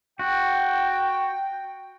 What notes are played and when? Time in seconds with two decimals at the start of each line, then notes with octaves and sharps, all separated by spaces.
0.19 F#4 G5